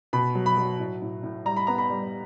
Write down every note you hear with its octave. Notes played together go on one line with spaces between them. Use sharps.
B2 B5
F#3
B5
F#3
A2
A2
A2
G3 A#5
B5
B3 A#5
B5
G3